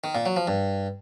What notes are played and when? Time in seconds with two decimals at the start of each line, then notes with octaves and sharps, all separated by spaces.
0.04 D#3
0.15 A#2
0.26 F#3
0.36 F3
0.47 G2